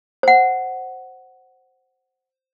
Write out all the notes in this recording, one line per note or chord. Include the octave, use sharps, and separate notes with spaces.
C5 F#5